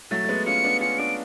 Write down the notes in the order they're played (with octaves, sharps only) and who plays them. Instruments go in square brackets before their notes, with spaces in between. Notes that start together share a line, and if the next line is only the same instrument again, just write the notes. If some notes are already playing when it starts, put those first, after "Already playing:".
[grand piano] F#3 A3 [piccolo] A6
[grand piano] A3
G#3 B3
[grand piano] C#4 F4 [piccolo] C#7
[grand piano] B3 D4
[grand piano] C#4 F4 [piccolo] C#7
[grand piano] B3 D4 [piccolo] D7